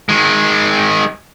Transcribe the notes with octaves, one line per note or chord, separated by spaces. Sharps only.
D#3 G#3